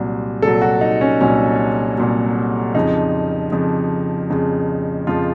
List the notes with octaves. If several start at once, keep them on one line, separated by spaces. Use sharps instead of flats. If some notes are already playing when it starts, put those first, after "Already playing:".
Already playing: C2 A#2 F#3
C2 A#2 F#3 A4
F#4
D#4
C#4
C2 A#2 F#3 C#4
C2 A#2 F#3
F2 C#3 F3 D#4
F2 C#3 F3
F2 C#3 F3
F2 C#3 F3 F4